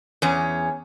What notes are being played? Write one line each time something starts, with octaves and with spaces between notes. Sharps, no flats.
E2 C#4